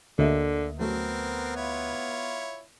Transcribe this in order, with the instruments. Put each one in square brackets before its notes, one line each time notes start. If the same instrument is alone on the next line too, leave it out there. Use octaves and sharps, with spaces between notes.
[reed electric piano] D2 [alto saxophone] D3 [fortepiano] A#3 D#5 E5
[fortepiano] F#3 A3 [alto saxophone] B3 [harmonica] C4 A#4
[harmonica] E4 F4 C#5